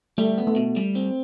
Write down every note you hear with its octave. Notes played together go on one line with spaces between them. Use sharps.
G3 A3
B3
A3
B2
G3
C4